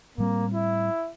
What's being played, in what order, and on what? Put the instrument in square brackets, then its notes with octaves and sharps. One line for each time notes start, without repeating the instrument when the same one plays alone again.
[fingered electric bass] A2 G3 C4 [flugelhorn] A#3
[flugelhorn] E4